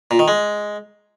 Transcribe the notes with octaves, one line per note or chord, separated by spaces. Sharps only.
A#2
D#3
G#3